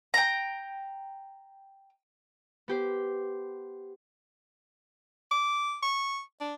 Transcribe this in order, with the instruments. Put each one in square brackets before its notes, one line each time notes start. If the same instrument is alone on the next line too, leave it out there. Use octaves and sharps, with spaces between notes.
[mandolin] G5 A#5
[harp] B3 G4 C5
[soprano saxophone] D6
C#6
D4